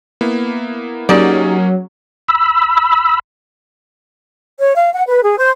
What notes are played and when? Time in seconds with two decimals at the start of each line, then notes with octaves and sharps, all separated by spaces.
0.21 A#3 B3 E4
1.09 F#3 A#3 C#4 D#4 G4 G#4 D5
2.28 B5 E6
4.61 C#5
4.76 F5
4.93 F#5
5.08 B4
5.24 G#4
5.38 C5